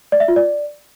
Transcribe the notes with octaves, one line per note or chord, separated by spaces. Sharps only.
D5
E5
F4
D5